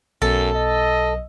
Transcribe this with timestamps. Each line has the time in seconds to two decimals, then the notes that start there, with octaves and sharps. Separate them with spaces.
0.22 B1 F#2 A4
0.55 D#5